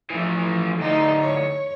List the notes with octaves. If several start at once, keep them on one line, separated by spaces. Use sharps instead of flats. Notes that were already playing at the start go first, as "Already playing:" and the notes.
E3 F3 A3
D2 A2 D#4
C#5